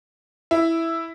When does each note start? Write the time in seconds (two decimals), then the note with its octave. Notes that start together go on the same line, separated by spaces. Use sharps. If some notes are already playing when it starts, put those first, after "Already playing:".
0.51 E4